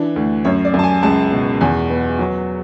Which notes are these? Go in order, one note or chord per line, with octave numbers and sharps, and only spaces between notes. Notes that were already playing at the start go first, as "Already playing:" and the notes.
Already playing: E3 D4
D2
F#2 C#5
D5
F#2
A5
G#5
C#2 A5
B2
E2 G#5
B3
F#3